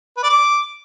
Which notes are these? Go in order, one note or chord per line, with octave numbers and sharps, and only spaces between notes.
B4
D5
D6